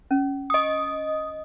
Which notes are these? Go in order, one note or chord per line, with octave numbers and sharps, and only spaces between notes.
C#4
D#5 D#6